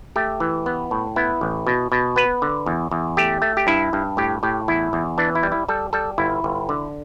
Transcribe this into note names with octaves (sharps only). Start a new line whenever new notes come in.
A3 G4
E3
B3
A2
B3 E4
A1
B2
B2
B3 B4
D3
E2
E2
A3 G4
A3
G4
G2 E4
G2
A2 G4
A2 G4
E2 E4
E2
E3 D4
E4
G3
E4
G3 A4
G3 A4
G1 E4
G1
D3